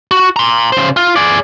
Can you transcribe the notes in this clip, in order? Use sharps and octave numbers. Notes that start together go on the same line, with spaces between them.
F#4
A#5 C6
C#3 C5
F4
G#4 D5